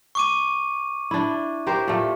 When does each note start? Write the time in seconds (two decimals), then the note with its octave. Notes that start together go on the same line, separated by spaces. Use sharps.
0.15 C#6 D6 D#7
1.11 D4 E4
1.67 G4 A#4 C5
1.88 A#2 A3